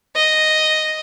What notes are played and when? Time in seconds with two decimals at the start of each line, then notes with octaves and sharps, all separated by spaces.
0.15 D#5